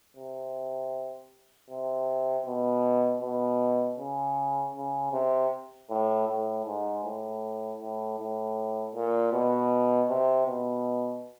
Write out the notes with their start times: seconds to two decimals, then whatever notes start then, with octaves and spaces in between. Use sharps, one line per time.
0.17 C3
1.70 C3
2.46 B2
3.22 B2
3.98 C#3
4.75 C#3
5.13 C3
5.90 A2
6.27 A2
6.66 G#2
7.04 A2
7.81 A2
8.19 A2
8.95 A#2
9.33 B2
10.10 C3
10.47 B2